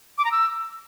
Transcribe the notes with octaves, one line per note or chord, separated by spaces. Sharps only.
D6
A#5
E6